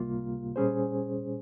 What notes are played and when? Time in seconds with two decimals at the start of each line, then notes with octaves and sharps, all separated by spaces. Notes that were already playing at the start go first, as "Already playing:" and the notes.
Already playing: C#2 C3 G3 A#3 F4
0.56 A#2 G3 C#4 G#4 C5